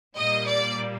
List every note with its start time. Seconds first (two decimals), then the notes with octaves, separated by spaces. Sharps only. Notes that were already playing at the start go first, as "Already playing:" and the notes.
0.16 A#2 G3 A#3 D#5
0.48 D5